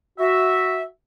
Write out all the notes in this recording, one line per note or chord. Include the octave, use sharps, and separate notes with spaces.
F#4 E5